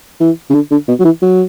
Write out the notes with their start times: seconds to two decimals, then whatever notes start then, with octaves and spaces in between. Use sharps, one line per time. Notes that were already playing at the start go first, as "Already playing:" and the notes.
0.20 E3
0.50 C#3
0.54 D3
0.71 D3
0.88 B2
0.99 F#3
1.05 E3
1.22 F#3